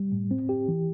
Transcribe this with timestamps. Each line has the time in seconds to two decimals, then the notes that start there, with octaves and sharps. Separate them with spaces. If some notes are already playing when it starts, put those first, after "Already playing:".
Already playing: G3
0.12 A2
0.31 C4
0.49 G4
0.68 E3